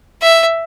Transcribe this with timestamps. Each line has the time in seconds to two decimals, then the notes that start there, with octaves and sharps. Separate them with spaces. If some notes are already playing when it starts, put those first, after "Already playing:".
0.22 E5